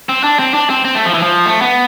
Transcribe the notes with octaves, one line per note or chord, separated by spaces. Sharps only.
C4
D4
C4
D4
C4
C4
A3
F3
E3
F3
A3
B3